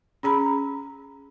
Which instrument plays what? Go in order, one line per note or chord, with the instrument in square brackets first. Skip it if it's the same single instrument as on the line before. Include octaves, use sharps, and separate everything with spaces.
[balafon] C#4 G#4 A#5 B5